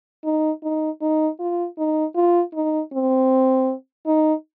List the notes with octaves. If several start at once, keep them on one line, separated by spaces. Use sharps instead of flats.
D#4
D#4
D#4
F4
D#4
F4
D#4
C4
D#4